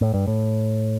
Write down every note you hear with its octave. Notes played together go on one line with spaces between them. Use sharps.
A2
G2
A2